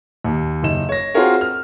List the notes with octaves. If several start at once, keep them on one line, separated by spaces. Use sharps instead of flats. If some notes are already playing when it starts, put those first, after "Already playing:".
D#2
F#1 D#4 E7
C#5 A#6
C4 F4 F#4 G#4 A#4 C#5
F6